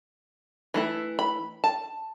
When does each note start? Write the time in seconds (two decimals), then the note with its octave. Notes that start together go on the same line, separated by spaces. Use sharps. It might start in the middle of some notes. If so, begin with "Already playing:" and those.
0.74 E3 A3 E4
1.19 B5
1.64 A5